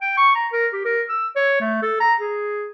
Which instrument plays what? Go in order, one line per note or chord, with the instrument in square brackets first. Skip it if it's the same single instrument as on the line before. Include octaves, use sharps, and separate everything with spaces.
[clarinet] G5
C#6
A#5
A#4
G4
A#4
E6
C#5
A3
A4
A#5
G#4